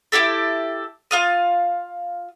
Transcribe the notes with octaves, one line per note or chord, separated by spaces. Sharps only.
E4 F#4 G4 A4
F4 F5 D#6